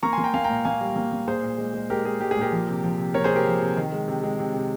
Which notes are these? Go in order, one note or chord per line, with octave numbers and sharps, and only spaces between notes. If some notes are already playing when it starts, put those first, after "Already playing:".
A#3 A#5 C#6
G#5 C6
A#3
G5 A#5
A#3 F5 G#5
G5 A#5
A#2
A#3 F5 G#5
G3
A#3
A#3
A#2 G#4 C5
A#2
G#3
G#3
G#3 G4 A#4
G#3 G#4
G#3 G4
G#4
A#2 G4 A#4
F3
C3
F3
C3
A#3 A#4 C#5
G#4 C5
C3
G4 A#4
F3
C3
D#3
G#3
C3
G#3
C3
C3